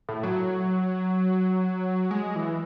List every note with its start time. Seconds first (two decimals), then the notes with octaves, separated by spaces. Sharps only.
0.09 A2
0.23 F#3
2.11 G#3
2.35 E3